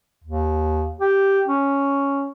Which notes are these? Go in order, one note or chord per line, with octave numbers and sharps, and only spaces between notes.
D#2
G4
C#4